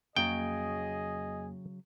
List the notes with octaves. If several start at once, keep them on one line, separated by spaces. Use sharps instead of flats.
F2 C#3 F#3 A#3 G#4 D#5 G5